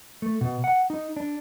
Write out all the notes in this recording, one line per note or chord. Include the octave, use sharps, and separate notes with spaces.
A3
B2
F#5
D#4
D4